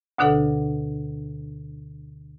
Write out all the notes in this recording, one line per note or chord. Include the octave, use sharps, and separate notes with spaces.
D2 B2 D3 D4 A4 F#5